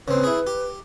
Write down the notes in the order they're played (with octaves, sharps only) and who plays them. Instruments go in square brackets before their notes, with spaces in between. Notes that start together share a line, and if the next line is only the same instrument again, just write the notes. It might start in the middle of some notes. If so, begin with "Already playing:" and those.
[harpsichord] C#3 C4 [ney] B4
[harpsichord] E4 G#4
G4